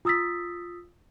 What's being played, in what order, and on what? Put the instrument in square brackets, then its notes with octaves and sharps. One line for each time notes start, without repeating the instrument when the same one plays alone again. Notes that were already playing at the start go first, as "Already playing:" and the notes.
[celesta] F4 D#6 E6 A6 B6